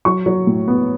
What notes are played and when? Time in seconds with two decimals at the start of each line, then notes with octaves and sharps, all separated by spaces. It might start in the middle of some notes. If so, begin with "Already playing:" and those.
0.05 F#3 C#6
0.26 F#3
0.47 A2
0.68 B3